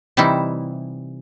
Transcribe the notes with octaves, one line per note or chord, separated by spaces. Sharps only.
C3 E3 G3 D#4 E4